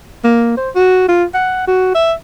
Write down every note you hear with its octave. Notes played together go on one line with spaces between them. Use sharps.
A#3
C5
F#4
F4
F#5
F#4
E5